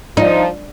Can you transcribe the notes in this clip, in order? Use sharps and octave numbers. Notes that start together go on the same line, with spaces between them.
F3 D#4